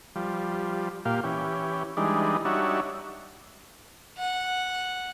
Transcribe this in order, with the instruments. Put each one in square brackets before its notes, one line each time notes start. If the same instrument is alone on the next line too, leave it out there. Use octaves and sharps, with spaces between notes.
[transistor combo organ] F3 G3
A#2 G4 F5
E3 C#4 G4
E3 G3 G#3 D4 D#4
G3 D4 D#4 F#4 C#5 E5
[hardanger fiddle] F#5